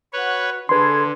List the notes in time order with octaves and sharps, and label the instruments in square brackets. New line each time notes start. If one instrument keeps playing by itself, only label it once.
[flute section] F#4 [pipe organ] B4 C#5
[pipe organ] D3 [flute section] G#4 A4 G#6 [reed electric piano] B4 C6